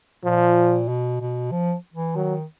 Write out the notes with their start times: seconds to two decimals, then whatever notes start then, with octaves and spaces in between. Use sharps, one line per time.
0.25 A#2 F3
0.88 B2
1.21 B2
1.52 F3
1.94 E3
2.15 D#3 F#3